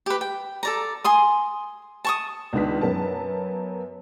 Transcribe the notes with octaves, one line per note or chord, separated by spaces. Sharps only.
G4 B4
G5
A4 D5 A#5
G#5 C6 D#6
A5 C#6 D#6
C#2 D#3 B3 D4 B6
F#2 B3 A#4 A5